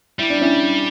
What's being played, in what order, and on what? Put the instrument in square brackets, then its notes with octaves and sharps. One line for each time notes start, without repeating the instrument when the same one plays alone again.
[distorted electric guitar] G3 [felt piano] E4
[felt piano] D4
C#4 E4